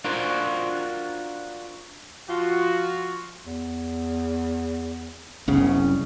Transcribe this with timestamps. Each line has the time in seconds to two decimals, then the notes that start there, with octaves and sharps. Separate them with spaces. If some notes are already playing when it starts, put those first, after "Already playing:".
0.04 D4 F4 F#4 A#4 C5
2.29 F3 F4 F#4
3.46 E2
5.48 F#1 C2 C#3 B3